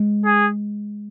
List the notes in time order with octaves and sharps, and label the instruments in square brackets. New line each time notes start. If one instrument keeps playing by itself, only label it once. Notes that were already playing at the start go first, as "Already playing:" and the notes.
Already playing: [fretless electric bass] G#3
[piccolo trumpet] G#4